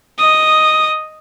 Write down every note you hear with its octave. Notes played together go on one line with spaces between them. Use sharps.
D#5 D#6